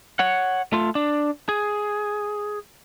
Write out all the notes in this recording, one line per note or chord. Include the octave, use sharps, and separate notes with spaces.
C#5 F#5
A3 F4
D4
G#4